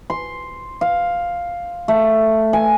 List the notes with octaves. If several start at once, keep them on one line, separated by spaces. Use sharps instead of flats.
C6
F5
A3
G#5